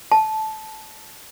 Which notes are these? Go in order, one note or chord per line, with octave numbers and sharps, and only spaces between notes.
A5